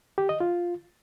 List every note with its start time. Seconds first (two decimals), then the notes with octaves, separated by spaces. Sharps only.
0.18 G4
0.29 D#5
0.40 F4